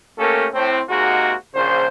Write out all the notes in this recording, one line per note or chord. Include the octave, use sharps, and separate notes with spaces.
A3 A#3 C#4 G4 A4 A#4
A2 C4
G#2 C3 G#3 A#3 F#4
A#1 C#3 C5